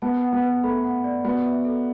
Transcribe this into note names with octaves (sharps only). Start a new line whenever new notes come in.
B3 A5
F#5
B3
B4
A3 B5
F#5
D5
B3 F#4
E5
A4